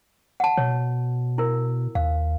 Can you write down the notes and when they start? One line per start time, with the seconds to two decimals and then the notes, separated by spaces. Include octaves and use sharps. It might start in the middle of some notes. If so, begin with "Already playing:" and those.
0.40 F#5 A5
0.57 B2 C#5
1.38 E4 A#4
1.95 D#2 F5